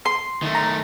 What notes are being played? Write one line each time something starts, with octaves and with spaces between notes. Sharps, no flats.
C6
D#3 A3
A#5